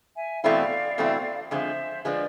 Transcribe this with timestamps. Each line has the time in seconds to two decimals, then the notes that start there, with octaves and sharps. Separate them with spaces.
0.17 E5 G#5
0.43 E2 B2 A3 C4 E4 D5 F5
0.98 E2 B2 A3 C4 E4
1.51 F2 D3 F3 G#3 C5 E5
2.05 D3 F3 G#3 B4 D5